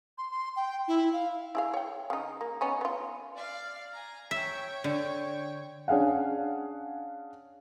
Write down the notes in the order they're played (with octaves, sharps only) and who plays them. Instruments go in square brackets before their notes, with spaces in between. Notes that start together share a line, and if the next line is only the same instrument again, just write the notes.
[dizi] C6
C6
G5
E4
F5
[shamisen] E4 G#4 F5
C#5 G5
C#3 D#4
A#3
B3 C#4 D#4
B3 F4
[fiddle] D5 F5
G#5 A#5
[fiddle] C#5 G5 [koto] E5
[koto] D3
[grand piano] C#4 D4 G#4 F5 F#5